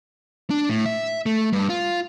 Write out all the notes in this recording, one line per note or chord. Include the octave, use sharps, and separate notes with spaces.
D4
A2
E5
A3
G2
F4